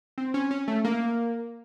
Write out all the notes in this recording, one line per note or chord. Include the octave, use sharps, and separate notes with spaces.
C4
C#4
C#4
A3
A#3